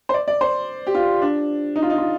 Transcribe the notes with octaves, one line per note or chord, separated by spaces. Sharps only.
C5
D5
D5
C5
G4
F4
D4
D#4
F4
D#4
F4